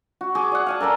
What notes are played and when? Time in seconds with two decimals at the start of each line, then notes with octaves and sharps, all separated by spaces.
0.21 F#4
0.35 G#4 D6
0.52 D5 F#5
0.67 F5 G#5 A5
0.81 A4 A#4 D5 C6